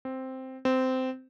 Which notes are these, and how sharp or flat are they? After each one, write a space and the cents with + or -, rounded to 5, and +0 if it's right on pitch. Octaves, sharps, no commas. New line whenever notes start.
C4 +0
C4 -15